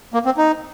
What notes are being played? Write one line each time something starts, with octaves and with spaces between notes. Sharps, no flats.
A#3
C4
D#4